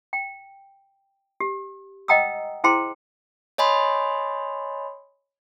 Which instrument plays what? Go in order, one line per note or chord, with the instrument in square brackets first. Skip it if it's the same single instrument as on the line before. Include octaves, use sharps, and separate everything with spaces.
[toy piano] G5
G4
D#5 F#5 G5 A#5 D#6 E6
E4 G#4 C5 G5 A#5 C6
[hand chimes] C#5 D#5 G#5 B5 C6